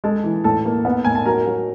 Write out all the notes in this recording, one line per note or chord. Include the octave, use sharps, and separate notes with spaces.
G#3 A4 A5
E3
A2 A4 A5
A#3
B3
A2 G#5
A5
F#3 A#4 A#5
F#3